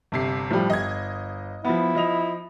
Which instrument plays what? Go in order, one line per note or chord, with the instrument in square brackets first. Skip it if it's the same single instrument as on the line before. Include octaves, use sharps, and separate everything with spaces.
[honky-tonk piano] G1 C3 C7
[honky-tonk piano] A2 [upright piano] F3 G3
[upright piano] G1 [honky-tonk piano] D#5 G#6
[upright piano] F3 B3 [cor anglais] E4
[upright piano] F3 D#5 F7